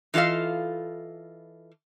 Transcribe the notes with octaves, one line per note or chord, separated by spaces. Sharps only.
E3 F4 A4 D#5 F5